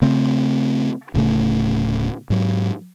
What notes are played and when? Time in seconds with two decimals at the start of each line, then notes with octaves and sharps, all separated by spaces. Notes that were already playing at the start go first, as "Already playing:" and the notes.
0.02 C#3 A3 C4
1.14 D1 A2 C#3 A3
2.30 G#2 F#3